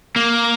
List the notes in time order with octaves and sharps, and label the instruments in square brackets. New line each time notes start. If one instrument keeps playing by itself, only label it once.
[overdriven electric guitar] A#3